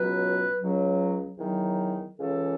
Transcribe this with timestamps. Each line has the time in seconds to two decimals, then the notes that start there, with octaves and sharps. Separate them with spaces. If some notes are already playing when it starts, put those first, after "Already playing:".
Already playing: C#2 B2 F#3 B4
0.60 C#2 C#3 F#3
1.38 E2 D#3 F#3
2.17 C#2 C#3 E3 A4